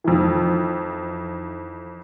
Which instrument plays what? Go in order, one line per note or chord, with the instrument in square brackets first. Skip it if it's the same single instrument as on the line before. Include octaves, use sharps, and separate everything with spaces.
[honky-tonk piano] F2 D#3 E3